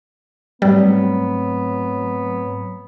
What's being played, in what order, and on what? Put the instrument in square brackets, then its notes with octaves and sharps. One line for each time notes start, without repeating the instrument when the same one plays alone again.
[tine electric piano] G#2 A3 C4 [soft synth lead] F#3 [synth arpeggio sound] G3 [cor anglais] B3